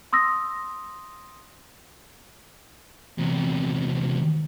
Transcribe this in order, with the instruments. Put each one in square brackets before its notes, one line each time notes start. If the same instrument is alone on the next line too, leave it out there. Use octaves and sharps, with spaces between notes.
[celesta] C6 D#6 E6 A#6
[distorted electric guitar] E2 C3